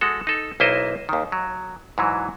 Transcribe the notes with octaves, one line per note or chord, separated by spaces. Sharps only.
G#3 F#4 A4
D#4 A4
B1 A#3 E4 C5 D#5
D#2 D#3
F#3
G#2 E3 F#3